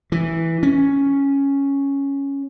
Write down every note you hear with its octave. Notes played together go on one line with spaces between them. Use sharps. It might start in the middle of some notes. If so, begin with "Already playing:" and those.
E3
C#4